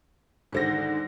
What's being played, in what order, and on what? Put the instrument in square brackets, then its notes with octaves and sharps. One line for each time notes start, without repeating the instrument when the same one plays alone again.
[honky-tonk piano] G#2 D3 A#6 [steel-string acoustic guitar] D#3 C5 F#5